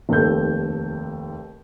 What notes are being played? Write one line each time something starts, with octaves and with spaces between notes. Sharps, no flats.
F1 D#2 A4 G6